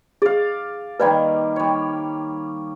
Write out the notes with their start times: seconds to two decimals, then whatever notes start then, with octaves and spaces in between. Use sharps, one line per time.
0.22 G#4 D5 F5
1.00 D#3 G3 A#3 B4 D5
1.56 G3 C#5